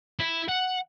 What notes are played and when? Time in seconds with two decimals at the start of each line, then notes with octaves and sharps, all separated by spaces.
0.19 E4
0.49 F#5